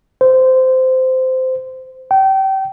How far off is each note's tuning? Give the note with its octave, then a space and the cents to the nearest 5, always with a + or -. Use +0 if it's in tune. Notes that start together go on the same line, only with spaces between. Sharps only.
C5 -15
G5 -30